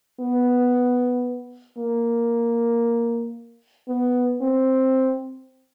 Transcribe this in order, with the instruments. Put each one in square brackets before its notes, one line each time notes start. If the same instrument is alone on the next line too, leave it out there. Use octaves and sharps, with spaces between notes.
[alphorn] B3
A#3
B3
C4